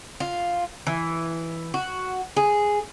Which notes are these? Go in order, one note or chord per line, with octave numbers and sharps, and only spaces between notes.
F4
E3
F#4
G#4